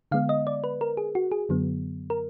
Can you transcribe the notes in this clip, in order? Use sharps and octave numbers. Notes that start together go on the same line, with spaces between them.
D3 G#3 B3 F5
D#5
D5
B4
A#4
G#4
F#4
G#4
F#2 D3 F#3 B3
A#4